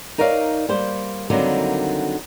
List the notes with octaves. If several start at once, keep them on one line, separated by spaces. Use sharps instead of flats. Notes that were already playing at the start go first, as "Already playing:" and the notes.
D#4 A#4 C#5 D5 F5
G3 A#3 C5
D3 D#3 F#3 G3 A#3 C4